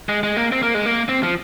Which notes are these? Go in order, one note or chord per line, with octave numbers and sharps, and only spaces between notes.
G#3
G#3
A#3
C4
A#3
G#3
A#3
C4
F3